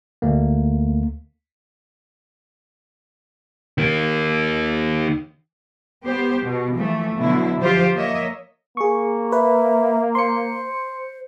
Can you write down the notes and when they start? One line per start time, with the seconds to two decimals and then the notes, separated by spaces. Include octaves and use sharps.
0.22 D2 A3 A#3
3.78 D#3 A#3
6.06 B3 G4 C5
6.43 B2
6.75 E3 F3 A3
7.17 B2 D3 F#3 E4
7.61 F3 F4 G4 C5
7.96 A#3 C#5 D#5 E5
8.77 A#3 G#4 C#6
9.32 B4 E5
10.15 C5 C6 C#7